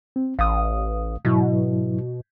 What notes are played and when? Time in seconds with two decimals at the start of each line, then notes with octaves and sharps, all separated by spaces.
0.16 C4
0.39 A1 F5 D#6
1.25 G#2 B2 F#3 E4